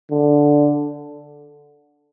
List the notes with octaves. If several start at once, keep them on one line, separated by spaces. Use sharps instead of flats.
D3